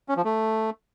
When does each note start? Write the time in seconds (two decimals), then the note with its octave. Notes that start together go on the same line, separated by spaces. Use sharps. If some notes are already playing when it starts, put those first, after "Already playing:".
0.09 C#4
0.17 F3
0.25 A3